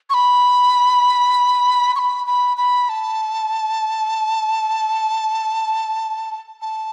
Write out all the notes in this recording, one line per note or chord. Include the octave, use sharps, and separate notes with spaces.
C#6
B5
C#6
B5
B5
B5
A5
A5